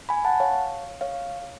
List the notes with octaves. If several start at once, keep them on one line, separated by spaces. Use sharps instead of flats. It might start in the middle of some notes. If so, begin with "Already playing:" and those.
G#5 B5
F#5 A5
C#5 F5
C#5 F5